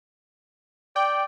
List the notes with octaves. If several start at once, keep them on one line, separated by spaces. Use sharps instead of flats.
D5 G5